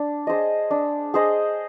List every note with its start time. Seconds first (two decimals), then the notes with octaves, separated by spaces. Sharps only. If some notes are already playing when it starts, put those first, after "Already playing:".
Already playing: D4
0.27 G#4 C5 D#5
0.71 D4
1.14 G#4 C5 D#5